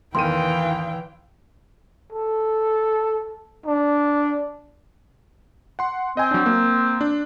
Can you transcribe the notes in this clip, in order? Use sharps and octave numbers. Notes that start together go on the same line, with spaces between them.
E2 D#3 E3 F5 G5 C6 D#7
A4
D4
F#5 C6
C4 D#5 G#5
F#3 D4
A#3
D4